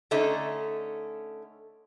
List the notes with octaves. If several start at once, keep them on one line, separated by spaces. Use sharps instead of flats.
D3 A3 C#4 D#4